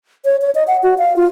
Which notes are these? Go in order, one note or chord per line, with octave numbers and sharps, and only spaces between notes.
C#5
C#5
D#5
F#5
F#4
F5
F4